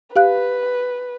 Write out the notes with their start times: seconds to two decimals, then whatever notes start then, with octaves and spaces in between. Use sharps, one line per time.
0.16 G4 B4 F5 F#6